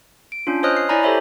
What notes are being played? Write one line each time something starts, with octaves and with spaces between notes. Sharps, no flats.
D7
C#4 D4 F4
C5 C#5 D#5 D#6 F6 F#6
C7
E4 C#5 D5 G#5 A#5 B5
G4 A4 C5 C#5 E5 B5